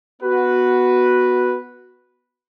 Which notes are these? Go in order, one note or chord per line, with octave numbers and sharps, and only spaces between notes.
B3 F#4 B4